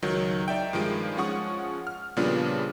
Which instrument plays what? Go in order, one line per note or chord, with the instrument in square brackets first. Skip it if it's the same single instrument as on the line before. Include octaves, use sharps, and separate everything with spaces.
[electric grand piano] C#2 D#3 F#3
D#4 D5 E5 G5
G2 D#3 F3 G#3 D7
F3 G#3 C#4 F#5 C#6 D#6
F6
A#2 C#3 F3 G3 B3 D4